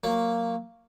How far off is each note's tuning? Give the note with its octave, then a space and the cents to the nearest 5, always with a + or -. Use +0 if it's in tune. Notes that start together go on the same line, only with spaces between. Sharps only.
F#3 -15 A#3 -10